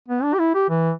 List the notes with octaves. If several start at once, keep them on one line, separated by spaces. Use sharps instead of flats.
B3
D4
G4
E4
G4
E3